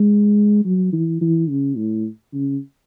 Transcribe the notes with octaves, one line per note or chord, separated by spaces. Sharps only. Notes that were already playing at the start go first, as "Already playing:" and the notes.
Already playing: G#3
F#3
E3
E3
C#3
A2
C#3